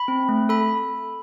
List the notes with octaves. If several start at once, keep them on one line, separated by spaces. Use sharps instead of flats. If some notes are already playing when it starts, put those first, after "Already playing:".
Already playing: B5
C4
A3
A4 B5